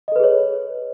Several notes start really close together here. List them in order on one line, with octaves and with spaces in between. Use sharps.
D#5 A4 B4 G#4 C#5